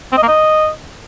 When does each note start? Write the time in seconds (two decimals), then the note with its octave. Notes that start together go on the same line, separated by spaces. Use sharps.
0.12 C4
0.17 D#5
0.23 A#3
0.28 D#5